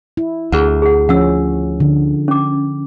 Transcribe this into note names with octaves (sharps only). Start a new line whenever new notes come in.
E4
D2 G#4 F#5
G#4 F#5
F3 C#4 F#5 E6
D3
C#4 D6